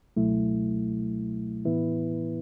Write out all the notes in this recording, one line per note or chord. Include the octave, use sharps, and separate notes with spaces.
C#2 B2 F#3 A3 E4
A2 E3 B3 E4 B4